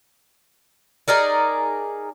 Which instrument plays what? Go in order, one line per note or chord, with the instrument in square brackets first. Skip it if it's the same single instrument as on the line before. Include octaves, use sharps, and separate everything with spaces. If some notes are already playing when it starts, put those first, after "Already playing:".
[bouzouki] D#4 G#4 A#4 D5